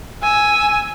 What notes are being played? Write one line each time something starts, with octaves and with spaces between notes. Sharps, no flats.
G#5 E6